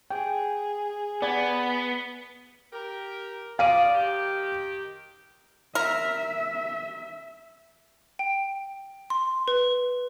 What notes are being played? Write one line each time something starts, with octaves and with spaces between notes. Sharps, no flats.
G#4 G5
B3 D5 G#5
G4 A#4
F3 D5 F5 D#7
D#3 G4
A#4 E5
G5
C6
B4